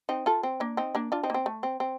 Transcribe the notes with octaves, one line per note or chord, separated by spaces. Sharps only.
C4 D#4
F4 A4
C4
A#3 D4
C4 D#4
A#3 D4
D4 F4
C4 D#4
A#3
C4
A3
C4
C4